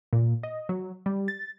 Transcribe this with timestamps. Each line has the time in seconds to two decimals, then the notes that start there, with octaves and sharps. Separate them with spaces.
0.13 A#2
0.43 D#5
0.69 F#3
1.06 G3
1.28 A6